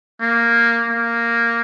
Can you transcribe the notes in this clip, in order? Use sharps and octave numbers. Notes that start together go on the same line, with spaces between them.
A#3
A#3